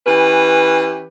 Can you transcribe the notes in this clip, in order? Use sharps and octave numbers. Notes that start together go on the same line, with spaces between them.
E3 C#4 G4 B4